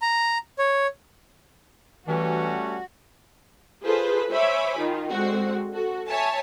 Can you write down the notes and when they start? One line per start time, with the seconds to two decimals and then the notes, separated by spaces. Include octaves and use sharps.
0.02 A#5
0.59 C#5
2.08 E3 G3 A3 C#4 F#4
3.84 F4 G#4 A4 B4 C5
4.31 C5 C#5 E5 G#5 B5 D6
4.78 D#3 D#4 F4
5.11 D3 G#3 C4 F#4
5.73 F#4 A4
6.08 C#5 E5 G#5 A5